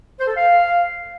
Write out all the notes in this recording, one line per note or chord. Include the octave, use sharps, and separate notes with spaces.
C5
A4
F5